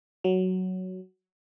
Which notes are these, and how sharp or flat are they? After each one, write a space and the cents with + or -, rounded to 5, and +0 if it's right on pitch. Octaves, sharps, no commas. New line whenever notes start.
F#3 +5